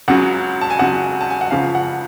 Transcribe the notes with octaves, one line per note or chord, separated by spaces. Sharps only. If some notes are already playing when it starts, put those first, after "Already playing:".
C#2 C#3 F#3 F#5
A5
G#5
C#2 C#3 F#3 F#5
A5
G#5
F#5
C#2 C#3 F3 F5
F#5